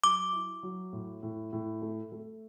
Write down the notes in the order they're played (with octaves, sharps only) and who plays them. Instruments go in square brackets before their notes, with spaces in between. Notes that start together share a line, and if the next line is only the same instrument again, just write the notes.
[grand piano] F#3 [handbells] D6
[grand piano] E4
F#3
A2
A2
A2
A3
A3